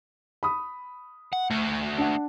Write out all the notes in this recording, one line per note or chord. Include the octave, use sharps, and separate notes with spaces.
B5 D#6
F#5
A3 F#4
D4 F#5